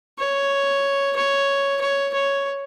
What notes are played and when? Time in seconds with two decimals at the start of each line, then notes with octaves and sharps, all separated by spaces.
0.19 C#5
1.16 C#5
1.81 C#5
2.14 C#5